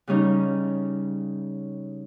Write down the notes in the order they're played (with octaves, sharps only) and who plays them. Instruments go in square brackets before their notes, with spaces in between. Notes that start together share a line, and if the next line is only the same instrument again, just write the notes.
[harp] C#3 G3 C#4 D#4